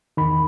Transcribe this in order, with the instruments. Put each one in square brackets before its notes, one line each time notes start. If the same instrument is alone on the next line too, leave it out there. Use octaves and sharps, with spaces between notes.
[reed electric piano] E2 D#3 B5